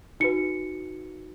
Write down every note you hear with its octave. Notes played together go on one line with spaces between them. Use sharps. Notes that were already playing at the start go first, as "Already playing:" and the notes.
D#4 F#4 B4 C#7